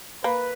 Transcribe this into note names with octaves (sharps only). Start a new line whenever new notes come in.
A#3 B4